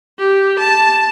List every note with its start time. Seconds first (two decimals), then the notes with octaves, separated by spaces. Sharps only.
0.19 G4
0.60 A5